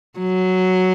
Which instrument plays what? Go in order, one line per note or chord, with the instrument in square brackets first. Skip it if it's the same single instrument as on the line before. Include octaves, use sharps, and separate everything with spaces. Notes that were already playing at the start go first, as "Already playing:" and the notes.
[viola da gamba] F#3